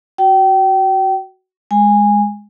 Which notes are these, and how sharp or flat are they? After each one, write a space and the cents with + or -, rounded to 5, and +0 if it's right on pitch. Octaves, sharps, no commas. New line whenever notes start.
F#4 +5 G5 -30
G#3 +0 G#5 -15